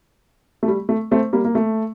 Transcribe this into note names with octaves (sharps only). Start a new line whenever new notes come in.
A3
G3
A3
A3 C4
G3 A#3
A#3
A3